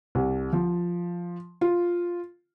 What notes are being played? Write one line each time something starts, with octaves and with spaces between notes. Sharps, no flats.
C2
F3
F4